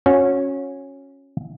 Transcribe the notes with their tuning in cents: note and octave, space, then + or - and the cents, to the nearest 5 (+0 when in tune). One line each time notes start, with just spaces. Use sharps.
C#4 -10 F#4 -25